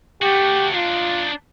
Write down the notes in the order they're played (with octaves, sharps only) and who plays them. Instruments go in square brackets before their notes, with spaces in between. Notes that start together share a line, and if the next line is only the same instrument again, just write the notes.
[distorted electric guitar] A3 F#4 [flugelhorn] G4
[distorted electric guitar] D4 D#4 [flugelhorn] F4